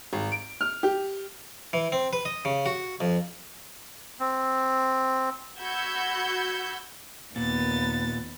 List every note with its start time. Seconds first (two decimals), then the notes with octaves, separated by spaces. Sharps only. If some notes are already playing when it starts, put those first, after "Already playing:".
0.13 G#1
0.32 D7
0.61 F6
0.83 G4
1.73 E3
1.92 C4
2.13 B4
2.25 D#5
2.45 C#3
2.66 F#4
3.01 F2
4.20 C4
5.59 F#4 B5 E6 G6 G#6 C#7
7.36 D#2 A#2 B3 A6